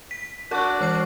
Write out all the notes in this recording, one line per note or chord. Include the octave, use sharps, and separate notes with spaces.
B6
D4 F#4 A#4 C#6
E3 F6 C7